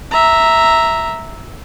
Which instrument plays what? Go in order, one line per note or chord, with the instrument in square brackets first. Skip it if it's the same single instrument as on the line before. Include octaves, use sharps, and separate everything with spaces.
[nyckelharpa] E5 A#5